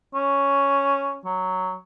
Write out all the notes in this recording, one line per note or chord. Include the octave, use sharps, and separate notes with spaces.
C#4
F#3